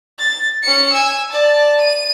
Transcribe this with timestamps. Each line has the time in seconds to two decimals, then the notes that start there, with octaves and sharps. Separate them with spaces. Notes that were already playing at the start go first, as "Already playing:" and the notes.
0.19 A6
0.63 C#4 C#7
0.93 G#5 E6
1.31 D5 A5
1.80 D#7